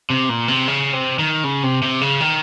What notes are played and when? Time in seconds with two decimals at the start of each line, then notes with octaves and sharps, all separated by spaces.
0.10 C3
0.29 A#2
0.48 C3
0.68 C#3
0.93 C3
1.19 D#3
1.44 C#3
1.63 C3
1.82 C3
2.01 C#3
2.20 D#3